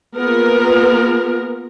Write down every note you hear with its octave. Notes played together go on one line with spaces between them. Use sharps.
A#3 B3 F4 G#4 A#4